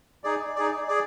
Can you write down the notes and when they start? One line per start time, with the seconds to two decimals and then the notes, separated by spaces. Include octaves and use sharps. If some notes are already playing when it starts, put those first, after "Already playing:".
0.24 D#4 G#4 D5
0.56 D#4 G#4 D5
0.88 G#4 D5